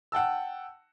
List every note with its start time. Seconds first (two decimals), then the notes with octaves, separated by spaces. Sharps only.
0.12 F#5 G5 A5 E6